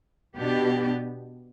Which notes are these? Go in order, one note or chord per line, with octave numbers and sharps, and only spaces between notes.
B2 B3 D4 G4